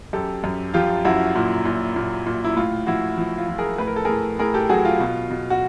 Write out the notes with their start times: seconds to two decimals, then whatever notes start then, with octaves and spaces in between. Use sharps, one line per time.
0.13 F#2 G4 A4
0.44 F#2
0.74 F3 F4 G4
1.05 F#2 E4 F#4
1.35 A#2
1.65 A#2
1.96 A#2
2.26 A#2
2.44 E4
2.56 A2 F4
2.87 F3 E4 F#4
3.18 F3
3.38 F4
3.48 F3
3.58 G#4 A#4
3.78 A2 B4
3.87 A#4
3.96 A4
4.05 A2 G#4 A#4
4.39 A2 G#4 A#4
4.54 G4 A4
4.69 F#3 F#4 G#4
4.85 F4
5.00 B2
5.30 B2
5.50 F#4